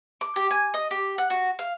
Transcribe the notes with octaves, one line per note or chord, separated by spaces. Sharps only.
D6
G4
G#5
D#5
G4
F#5
F#4
F5